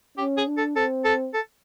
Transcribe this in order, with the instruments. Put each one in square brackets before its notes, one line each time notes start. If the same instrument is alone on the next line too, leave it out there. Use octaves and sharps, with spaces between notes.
[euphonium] C#4 [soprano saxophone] G4
[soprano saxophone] G#4
[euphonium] D4
[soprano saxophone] A4
[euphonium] C4 [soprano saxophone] A4
[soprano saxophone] A4
A4